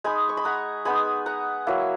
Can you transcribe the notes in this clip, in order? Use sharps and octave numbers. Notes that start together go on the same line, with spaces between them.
G#3 D#4 G#5 B5
C#6
B5
F#5 A#5
G#3 B3 D#4 G#5 B5
F#5 A#5
F#3 A#3 E4